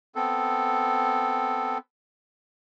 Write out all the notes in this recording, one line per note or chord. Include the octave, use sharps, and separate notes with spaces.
B3 C4 A4